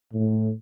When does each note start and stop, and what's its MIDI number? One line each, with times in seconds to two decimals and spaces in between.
0.14 0.50 45